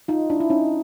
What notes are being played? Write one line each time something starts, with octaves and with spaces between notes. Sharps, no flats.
D#4 F4
D4 E4
E4
C#4 D#4